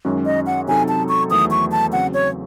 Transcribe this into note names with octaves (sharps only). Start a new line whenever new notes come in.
F#2 D#3 G#3 C#4 F#4
D#5
F#5
C3 F#3 C4 D#4 A4 G#5
A5
C#6
E2 D#3 F#3 A3 D#6
C#6
A5
C#3 F#3 C4 F#5
C#5